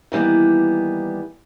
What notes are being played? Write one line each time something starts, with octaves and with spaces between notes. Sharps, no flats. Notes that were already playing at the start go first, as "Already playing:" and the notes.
D#3 E3 G3 A#3 B3